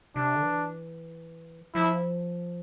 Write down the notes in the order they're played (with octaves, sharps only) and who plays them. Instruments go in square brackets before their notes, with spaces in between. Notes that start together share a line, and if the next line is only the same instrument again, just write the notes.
[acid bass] C3 [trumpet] D4
[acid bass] D3
E3
[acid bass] F3 [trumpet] E4